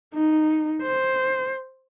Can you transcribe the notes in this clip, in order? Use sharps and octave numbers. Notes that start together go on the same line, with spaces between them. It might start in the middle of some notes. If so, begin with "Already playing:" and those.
D#4
C5